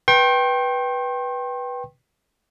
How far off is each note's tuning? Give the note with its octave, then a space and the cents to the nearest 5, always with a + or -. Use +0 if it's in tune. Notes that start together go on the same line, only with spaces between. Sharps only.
B4 -10 G5 -5 C6 +45